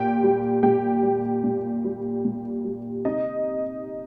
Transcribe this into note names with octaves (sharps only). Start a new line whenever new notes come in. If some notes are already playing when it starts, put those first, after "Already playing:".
Already playing: A#2 G4 G5
G3
A#2 G4 G5
G3
A#2
G3
A#2
G3
C3 D#4 D#5